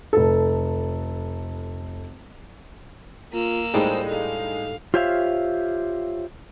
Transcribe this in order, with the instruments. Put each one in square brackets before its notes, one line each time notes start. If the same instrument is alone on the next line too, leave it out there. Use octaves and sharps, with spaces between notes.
[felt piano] F1 A4
[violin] A#3 E6 [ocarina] F4
[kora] A2 G3 D4 [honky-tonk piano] G#3 D#4 [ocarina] C5
[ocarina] A4 [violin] F5
[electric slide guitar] F4 G4 C5 C#5 E5 F5